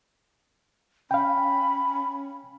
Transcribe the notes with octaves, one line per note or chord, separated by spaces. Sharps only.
C#4 F5 G5 B5